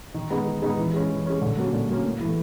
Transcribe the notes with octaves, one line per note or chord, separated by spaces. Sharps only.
D#3
G#3 B3 D#4
D#3
G#3 B3 D#4
E3
G#3 C#4
E3
G#3 C#4
D3
F#3 A#3 C#4
D3
F#3 A#3 C#4
A2
E3 A3